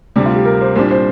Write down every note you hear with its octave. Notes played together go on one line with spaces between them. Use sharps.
D2 C3 G3 D4
F4
G4
A#4
C5
C2 A#2 G3 D4 C5
C5